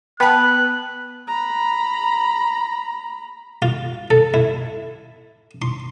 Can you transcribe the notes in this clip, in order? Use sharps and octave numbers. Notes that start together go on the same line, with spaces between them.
B3 B4 G5 A5 F#6
A#5 B5
F4
A4
E4
C6